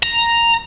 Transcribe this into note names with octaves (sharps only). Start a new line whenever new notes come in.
A#5